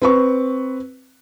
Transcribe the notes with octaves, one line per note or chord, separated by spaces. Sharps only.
C4 B4 C#6